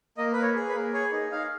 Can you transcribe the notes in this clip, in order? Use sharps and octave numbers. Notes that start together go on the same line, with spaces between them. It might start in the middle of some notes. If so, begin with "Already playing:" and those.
A#3 D#5
A#3 B4
C#5
G#4
B4
A#3
G#4 C#5
D#4
D#4 F5